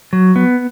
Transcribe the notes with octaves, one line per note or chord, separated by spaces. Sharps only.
F#3
B3